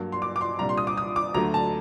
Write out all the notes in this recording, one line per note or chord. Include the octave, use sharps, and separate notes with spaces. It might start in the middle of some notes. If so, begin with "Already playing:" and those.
Already playing: G2 F#3 A#3
C6
D6
D6
C6
C2 A#2 G3 D4 A#5
C6
D#6
D6
D#6
D6
D2 D3 F#3 A3 A#5
A5